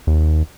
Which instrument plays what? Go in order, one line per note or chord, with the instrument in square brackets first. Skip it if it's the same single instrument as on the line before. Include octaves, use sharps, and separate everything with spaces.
[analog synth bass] D#2